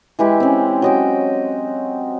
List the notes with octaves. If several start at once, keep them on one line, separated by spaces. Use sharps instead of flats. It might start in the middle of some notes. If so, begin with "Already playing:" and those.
E3 G#3 E4 G4
C4 C#4
F#3 D#5 G5